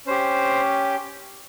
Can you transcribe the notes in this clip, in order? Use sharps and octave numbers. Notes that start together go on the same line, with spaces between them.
C#4 G4 C5